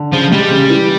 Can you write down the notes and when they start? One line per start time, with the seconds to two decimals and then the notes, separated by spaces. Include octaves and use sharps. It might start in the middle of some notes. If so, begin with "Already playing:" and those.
Already playing: D3
0.12 C#3 F3
0.31 G3 G#3
0.51 C#3
0.70 E3